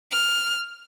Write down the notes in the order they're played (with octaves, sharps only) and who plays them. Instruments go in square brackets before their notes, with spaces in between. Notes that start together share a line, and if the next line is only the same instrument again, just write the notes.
[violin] F6